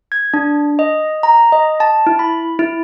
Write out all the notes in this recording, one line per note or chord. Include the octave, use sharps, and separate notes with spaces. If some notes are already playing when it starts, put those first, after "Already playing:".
G#6
D4
D#5
A#5
D#5
A5
E4
B5
E4